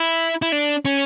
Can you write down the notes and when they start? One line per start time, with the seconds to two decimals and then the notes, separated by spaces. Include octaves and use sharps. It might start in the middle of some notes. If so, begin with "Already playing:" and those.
Already playing: E4
0.42 E4
0.52 D4
0.85 C#4